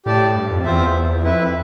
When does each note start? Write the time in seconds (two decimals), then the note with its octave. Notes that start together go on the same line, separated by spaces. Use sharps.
0.06 A2 G4 D5 A5
0.35 G2
0.50 F2
0.65 E2 C4 F4 C5 E5
1.23 F2 E4 B4 E5